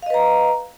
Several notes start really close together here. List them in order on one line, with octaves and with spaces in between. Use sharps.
F5 D#5 B4 A#5